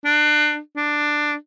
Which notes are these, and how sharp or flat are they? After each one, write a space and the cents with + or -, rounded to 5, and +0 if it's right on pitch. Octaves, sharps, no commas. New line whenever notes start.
D4 +30
D4 +10